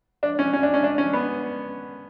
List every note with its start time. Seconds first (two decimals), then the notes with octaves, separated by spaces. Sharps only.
0.23 D4
0.39 C#4
0.53 C#4
0.63 D4
0.74 C#4
0.84 D4
0.98 C#4
1.13 B3